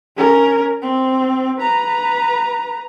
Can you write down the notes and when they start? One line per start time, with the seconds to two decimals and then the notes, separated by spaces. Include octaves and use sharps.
0.17 C#4 A#4
0.82 C4
1.59 B4 A#5